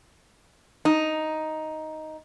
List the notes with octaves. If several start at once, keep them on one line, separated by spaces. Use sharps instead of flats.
D#4